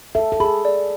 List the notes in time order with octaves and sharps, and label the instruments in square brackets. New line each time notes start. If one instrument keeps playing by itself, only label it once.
[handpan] A4 [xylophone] E5
[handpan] A4
[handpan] G#4 [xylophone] B5
[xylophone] D5